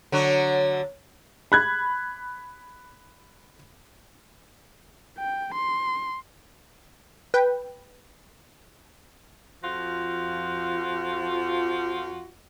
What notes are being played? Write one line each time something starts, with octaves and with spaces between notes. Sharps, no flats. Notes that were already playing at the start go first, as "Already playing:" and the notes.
D3 F#3 F#4
B5 F#6 G#6
G5
C6
B4 G5
F2 F3 F4 F#4